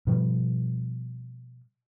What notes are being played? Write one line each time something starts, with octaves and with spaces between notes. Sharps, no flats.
B2 F3 G3